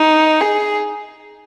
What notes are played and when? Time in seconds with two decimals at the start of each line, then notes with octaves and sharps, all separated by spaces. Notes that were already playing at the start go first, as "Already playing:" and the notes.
Already playing: D#4
0.41 G#4